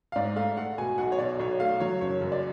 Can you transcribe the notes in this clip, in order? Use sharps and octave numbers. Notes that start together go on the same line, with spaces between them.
F5
G#2 D5
A3 F5
A3 F#5
B2 G#5
B1 F#5
C#5
B2 D5
B1 C#5
A3 F5
F#3 C#5
F#1 C#5
F#2
D5